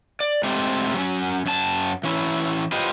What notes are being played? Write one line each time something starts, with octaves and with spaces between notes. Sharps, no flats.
D5
G#3 A3 C4 G4
F#3 C4 C#4
F#2 A5
E3 C#4 E4
F4 G4 B4 C5 D#5